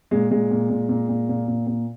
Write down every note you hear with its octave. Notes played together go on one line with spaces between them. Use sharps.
A#2 G#3
A#2 G#3
A#2
A#2
A#2
A#2
A#2
A#2
A#2